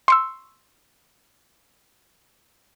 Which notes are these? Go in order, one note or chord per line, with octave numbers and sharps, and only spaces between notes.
C6 C#6 E6